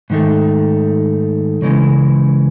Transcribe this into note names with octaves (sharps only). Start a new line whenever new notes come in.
G#2 D#3 A3
C#3 E3 G#3 C#4